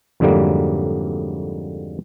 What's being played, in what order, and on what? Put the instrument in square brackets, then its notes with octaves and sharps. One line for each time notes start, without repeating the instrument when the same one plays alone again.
[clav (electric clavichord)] F2 G#2 D3 F#3 G3 A#3